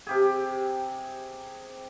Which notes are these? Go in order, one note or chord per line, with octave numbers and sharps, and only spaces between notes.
C3 G4 G#4